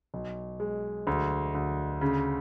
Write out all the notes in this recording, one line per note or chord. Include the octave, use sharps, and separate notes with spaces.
B1
G#3
D2
D2
C#3